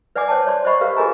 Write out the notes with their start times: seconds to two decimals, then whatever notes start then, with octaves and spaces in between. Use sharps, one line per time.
0.16 B4 D5 F#5 G#5 D6
0.28 C5 C#5 G5 A5
0.46 C#5 D5 C6
0.65 C5 D5 D#5 F#5 B5 C#6
0.81 G4 A#4 B4 F5
0.97 F4 G#4 A#4 D#5 G#5 A#5